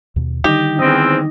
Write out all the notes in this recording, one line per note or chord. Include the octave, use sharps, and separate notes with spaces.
D#2 B2
D3 D#3 G3 D#4 G4
E2 C4 D#4